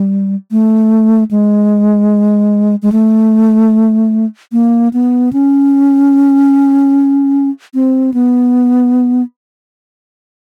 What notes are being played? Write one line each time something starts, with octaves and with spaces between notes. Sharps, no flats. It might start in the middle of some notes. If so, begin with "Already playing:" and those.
Already playing: G3
A3
G#3
G#3
A3
A#3
B3
C#4
C4
B3